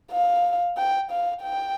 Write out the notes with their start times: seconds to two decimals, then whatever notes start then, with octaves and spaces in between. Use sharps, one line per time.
0.12 F5
0.78 G5
1.11 F5
1.43 G5